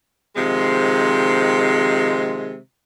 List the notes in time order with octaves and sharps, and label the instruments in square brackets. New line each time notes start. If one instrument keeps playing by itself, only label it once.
[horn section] C3 D#3 F3 G#3